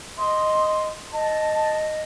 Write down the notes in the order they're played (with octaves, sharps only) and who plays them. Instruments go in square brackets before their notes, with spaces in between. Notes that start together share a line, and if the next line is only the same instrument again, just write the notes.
[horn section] D#5 [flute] C6
[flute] D#5 [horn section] A5